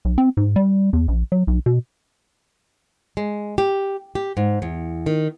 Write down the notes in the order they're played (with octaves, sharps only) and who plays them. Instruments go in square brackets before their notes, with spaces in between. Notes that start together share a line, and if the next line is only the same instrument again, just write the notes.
[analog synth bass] B1
C4
G#2
G3
E2
A#1
F#3
B1
B2
[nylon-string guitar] G#3
G4
G4
G#2
E2
D#3